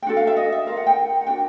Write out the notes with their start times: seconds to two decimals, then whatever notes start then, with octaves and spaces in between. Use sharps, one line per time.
0.02 G5
0.07 D4 F#4 A4 F#5
0.17 F5
0.27 E5
0.37 D#5
0.52 E5
0.67 F4 A#4 F5
0.77 F#5
0.87 G5
1.21 F#5
1.27 D4 F#4 A#4 G5